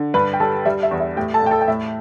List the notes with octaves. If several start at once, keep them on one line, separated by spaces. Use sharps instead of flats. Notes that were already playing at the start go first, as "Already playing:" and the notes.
Already playing: D3
G2 B4 B5
G5
G3 A4 A5
G3 E5
E5
E2
E5
A2 G4 G5
A4 A5
A2 G5
A4 A5
G5
A2 E5